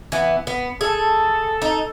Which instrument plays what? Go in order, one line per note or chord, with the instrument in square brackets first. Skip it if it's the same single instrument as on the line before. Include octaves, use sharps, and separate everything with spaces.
[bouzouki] E3 B3
B3
[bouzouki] G#4 [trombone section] A4
[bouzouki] D#4